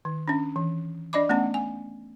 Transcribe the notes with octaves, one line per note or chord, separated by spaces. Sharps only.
D#3
C#4 D4
E3
D4 D5 D#5 B5 D6
A3 B3 C#4 F#5
G#5